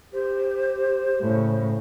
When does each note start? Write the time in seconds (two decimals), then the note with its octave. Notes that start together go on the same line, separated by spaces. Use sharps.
0.13 G4 C5
1.21 A2 C#3